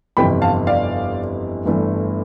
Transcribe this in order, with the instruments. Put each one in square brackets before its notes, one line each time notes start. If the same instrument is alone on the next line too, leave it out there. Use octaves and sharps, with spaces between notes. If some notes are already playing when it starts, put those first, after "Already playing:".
[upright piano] G1 F2 C3 E3 G5 B5
F5 A5
D5 F5
G1 G2 E3 A3